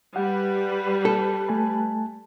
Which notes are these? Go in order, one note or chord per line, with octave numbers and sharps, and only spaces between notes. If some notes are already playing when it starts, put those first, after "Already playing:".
G3 B4 F#5
A4
A3 G#5 A5